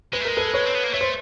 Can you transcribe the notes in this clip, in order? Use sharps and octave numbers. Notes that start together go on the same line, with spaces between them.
G#3 B4
A3
G#3 A#4
A4 B4
B4 C#5
C4
B3
A#3
A3 C#5
C5